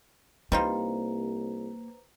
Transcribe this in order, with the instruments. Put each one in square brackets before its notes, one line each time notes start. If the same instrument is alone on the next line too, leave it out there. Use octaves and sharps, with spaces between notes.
[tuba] C2 [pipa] G3 D#4 F4 [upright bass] A#3 [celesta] B4 C5 A#5